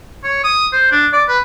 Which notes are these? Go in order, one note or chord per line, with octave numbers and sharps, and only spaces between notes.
C#5
D#6
C5
D4
D5
B4